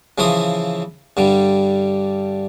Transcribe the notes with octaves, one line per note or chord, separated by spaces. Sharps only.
C#3 E3 F3 E4 C6 D#6
G2 D3 G3